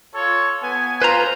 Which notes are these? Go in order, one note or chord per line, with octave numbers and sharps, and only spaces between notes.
F4 A4 C#5
B3 G#5
F4 B4 C5 A#5